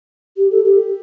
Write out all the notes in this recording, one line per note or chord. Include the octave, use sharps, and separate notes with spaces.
G4
A4
G4